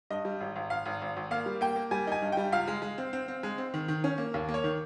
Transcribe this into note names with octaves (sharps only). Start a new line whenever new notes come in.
G2 D#5
G3
G#1
G#1
G#1 F5
G#1
G#1
G#1
A#3 F5
G3
A#3 G5
A#3
G3 G#5
D#4 G#5
G2
G3 G5
C#2 F5
G#3
G#3
C4
C4
C4
G#3
C4
D#3
D#3
C#4
A#3
D#2
A#3
C#5
D#3